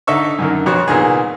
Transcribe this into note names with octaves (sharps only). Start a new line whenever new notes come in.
D3 D#4 A4 E5 C#6
F#2 D3 D#3
B1 F2 F#4 C#5
C2 A#2 D#3 B3 G#4